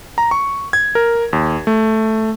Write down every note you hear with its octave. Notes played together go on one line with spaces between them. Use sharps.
A#5
C#6
G#6
A#4
D#2
A3